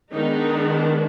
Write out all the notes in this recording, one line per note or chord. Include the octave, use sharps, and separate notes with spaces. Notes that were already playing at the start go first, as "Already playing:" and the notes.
D#3 G#3 B3 D4 D#4